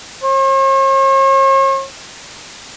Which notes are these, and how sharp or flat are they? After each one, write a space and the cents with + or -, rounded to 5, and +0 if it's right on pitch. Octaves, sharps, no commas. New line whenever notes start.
C#5 -45